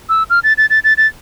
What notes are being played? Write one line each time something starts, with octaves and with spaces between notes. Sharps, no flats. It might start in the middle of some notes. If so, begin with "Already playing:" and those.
E6
F6
A6
A6
A6
A6
A6